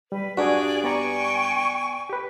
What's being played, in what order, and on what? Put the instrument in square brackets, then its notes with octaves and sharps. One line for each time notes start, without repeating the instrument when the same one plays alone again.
[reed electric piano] G3 [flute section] B4
[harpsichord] G2 [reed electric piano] D4 F#4 [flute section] G#4 D5
[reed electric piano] B3 D5 A#5 [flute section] G5 G#5 C#6
[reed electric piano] G4 B4